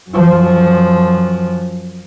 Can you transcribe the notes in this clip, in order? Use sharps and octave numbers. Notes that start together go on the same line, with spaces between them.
F#2 F3